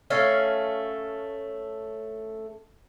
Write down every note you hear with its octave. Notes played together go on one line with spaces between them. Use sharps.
A3 C#4 F5